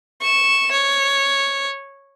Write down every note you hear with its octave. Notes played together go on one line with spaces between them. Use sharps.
C#6 E7
C#5